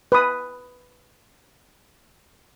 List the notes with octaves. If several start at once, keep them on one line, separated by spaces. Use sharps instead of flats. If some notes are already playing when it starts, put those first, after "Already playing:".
B4 D#6